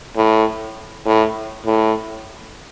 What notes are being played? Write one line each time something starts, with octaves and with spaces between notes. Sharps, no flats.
A2
A2
A2